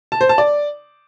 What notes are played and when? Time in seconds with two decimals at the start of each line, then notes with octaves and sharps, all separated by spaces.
0.12 A5
0.21 C5
0.29 A5
0.38 D5